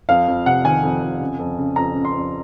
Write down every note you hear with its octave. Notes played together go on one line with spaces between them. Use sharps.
F2 F5
F2
C3 F#5
D#3 G#5
F2
F2
C#3
F2
C#3
F2 A#5
C#3
C6
F2